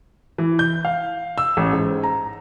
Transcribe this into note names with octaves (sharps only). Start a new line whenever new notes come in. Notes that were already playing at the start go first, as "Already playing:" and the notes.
E3
G6
F5
E6
A1
G#2
A#5